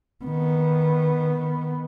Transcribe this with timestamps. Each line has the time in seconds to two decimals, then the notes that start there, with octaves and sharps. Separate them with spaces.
0.24 D#3 B3